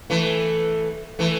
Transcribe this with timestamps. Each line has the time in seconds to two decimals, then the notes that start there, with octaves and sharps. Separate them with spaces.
0.10 E3 A3
1.19 E3 A3